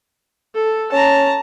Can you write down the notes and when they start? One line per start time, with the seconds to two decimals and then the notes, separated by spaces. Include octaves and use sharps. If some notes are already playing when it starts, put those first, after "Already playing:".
0.55 A4
0.92 C#4 A5 A#5